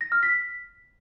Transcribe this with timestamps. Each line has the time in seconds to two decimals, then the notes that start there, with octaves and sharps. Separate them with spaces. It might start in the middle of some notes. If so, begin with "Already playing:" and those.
0.01 A#6
0.12 F6
0.23 B6